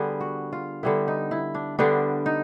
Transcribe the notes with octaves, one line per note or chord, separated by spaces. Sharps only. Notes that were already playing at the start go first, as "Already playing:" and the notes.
Already playing: D3 G3 B3 G#4
F#4
F4
D3 G3 B3 E4
D#4
E4
D4
D3 G3 B3 D4
D#4